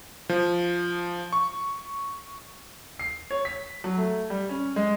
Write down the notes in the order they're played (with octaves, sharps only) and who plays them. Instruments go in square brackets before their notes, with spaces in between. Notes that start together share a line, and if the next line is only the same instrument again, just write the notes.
[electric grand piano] F3
C#6
[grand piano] C7
C#5
B6
F#3
A3
G3
C#4
G#3